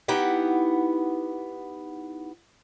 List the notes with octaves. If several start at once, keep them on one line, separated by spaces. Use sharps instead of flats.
B3 D#4 E4 G4 F#5